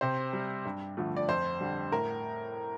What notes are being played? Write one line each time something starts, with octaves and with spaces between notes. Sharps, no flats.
C3 C5
G3
G2
D3 F3 A3
D5
F2 C5
D3 G3
A2 A#4